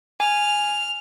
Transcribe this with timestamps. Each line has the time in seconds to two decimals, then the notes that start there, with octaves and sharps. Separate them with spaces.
0.20 G#5 F6